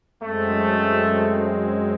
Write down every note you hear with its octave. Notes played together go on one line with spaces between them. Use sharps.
F#2 G#3 A3 C4